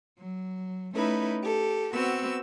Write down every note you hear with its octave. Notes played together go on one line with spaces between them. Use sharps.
F#3
A3 C#4 D#4 E4 B4
G4 A4
B3 C4 F#4 E6